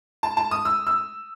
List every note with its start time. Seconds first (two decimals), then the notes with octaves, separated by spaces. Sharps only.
0.23 A5
0.37 A5
0.51 D#6
0.65 E6
0.87 E6